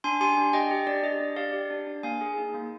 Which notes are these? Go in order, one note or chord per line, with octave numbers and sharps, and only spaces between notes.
D4 G#5 C6
G4 G#5 C6
D4
G4 D#5 G5
G4
D4 D5
G4 D#5
D4
G4 D5 F5
G4
D4
D4
A#3 F5 G#5
G#4
D#4
A#3